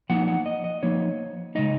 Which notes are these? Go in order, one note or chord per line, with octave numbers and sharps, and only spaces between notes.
F3 A#3 D#4 F#5
F#5
D#5
D#5
F3 A#3 D#4 C#5
C#3 G#3 D#4 D#5